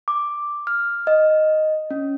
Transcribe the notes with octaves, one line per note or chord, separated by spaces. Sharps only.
D6
F6
D#5
C#4